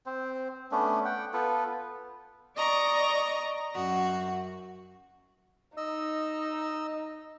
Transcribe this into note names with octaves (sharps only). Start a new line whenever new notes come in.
C4 C5
A3 B3 C#4 D4
F#5 G5
B3 F4 A4 B4
D5 D#5 A#5 C#6
F#2 F#4
D#4 D#5 E6